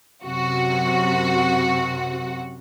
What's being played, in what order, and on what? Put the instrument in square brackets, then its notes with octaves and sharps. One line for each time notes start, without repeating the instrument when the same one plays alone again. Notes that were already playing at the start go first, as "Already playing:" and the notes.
[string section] F#2 C3 F#4